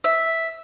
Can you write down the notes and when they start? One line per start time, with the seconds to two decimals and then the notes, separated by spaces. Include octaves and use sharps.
0.04 E5